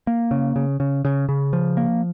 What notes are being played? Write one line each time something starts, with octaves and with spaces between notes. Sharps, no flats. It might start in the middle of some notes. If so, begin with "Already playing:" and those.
A#3
C#3
C#3
C#3
C#3
C#3
F3
A#3